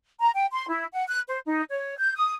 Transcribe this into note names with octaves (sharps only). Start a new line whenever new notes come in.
A#5
G5
C6
E4
F#5
F#6
C5
D#4
C#5
G6
D#6